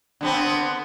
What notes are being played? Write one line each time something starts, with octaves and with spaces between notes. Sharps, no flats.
D3 B3 C4